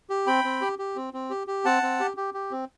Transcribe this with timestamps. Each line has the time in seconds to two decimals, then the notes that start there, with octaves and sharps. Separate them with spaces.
0.10 G4
0.27 C4 G5 B5
0.44 C4
0.61 G4
0.79 G4
0.96 C4
1.14 C4
1.30 G4
1.47 G4
1.65 C4 F#5 A5
1.83 C4
2.00 G4
2.17 G4
2.34 G4
2.51 C4